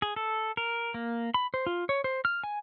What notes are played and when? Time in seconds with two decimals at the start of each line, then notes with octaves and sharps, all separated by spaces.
0.02 G#4
0.16 A4
0.57 A#4
0.94 A#3
1.34 B5
1.54 C5
1.67 F4
1.89 C#5
2.04 C5
2.25 F6
2.44 G#5